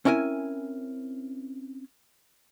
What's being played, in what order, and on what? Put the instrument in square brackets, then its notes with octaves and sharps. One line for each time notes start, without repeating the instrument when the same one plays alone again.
[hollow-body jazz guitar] C4 C#4 E4 A#4 G#5